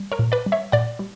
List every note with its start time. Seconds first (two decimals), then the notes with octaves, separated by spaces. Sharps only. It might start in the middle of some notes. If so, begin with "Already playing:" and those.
Already playing: G3
0.12 A#4 C#5
0.19 A#2
0.32 B4 D5
0.46 G3
0.52 C#5 E5
0.72 A#2 D5 F#5
0.99 G3